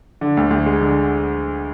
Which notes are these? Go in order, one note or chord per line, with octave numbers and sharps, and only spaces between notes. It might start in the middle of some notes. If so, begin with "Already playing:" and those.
D3
D2
D2
G#3
D3